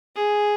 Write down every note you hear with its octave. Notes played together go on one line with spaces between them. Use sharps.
G#4